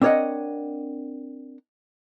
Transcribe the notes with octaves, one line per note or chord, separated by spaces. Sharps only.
C4 D4 A#4 C#5 D#5 F#5